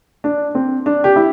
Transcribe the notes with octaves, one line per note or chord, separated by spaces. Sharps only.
D4
C4
D4
G4
E4